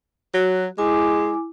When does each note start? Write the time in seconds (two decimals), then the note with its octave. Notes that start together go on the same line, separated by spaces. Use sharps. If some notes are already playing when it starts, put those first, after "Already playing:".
0.34 F#3 F#4
0.78 G#3 E4 G#5 D6